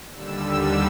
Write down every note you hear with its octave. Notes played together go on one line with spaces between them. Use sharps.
D#2 D3 G3 E6